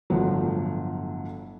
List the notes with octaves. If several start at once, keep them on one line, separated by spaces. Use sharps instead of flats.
G1 A2 F3 F#3